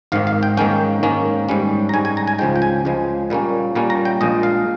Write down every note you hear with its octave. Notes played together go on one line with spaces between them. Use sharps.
G#1 G#2 D#3 F5
F5
G5
G#2 D#3 A#3 C#4 G5
G#2 D#3 A#3 C#4
G#2 G3 C#4
A#5
G#2 G3 C#4 G#5
G#5
A#5
G#5
C#2 C#3 F3 G#3 G5
G5
G#5
C#2 C#3 F3 G#3
A#2 G3 A#3 C#4
A#2 G3 A#3 C#4
A#5
G5
A#1 A#2 G#3 D#5
F5